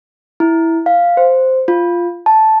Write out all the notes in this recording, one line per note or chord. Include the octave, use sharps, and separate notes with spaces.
E4
F5
C5
F4
A5